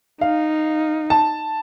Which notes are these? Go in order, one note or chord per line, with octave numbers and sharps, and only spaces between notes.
D#4 F5
A5